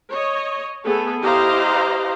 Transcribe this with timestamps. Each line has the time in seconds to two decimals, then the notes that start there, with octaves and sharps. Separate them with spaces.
0.12 C#5 D#5
0.84 A3 B3 G#4 A4
1.22 E4 G4 C5 D#5 F5 A#5